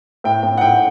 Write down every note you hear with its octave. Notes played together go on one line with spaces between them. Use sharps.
A2 G5
A2 G5
F#5
A2 G5